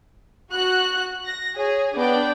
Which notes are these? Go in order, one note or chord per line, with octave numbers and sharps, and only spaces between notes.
F#4 F#6
A#6
G#4 C#5
B3 D4 D5 G5